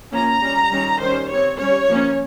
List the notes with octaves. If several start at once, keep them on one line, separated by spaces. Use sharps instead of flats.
F3 A#3 C#4 A#5
G3 C#4
D#3 G3 C#4
D#3 G3 C#4 C5
G3 C4 C#5
G3 C#4 C#5
F3 A#3 C#4